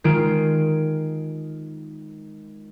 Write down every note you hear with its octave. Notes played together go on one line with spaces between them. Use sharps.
D#3 G#3 F4 D7